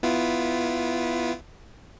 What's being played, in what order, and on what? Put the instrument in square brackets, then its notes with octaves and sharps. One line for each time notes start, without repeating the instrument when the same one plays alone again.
[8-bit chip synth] B3 E4 F4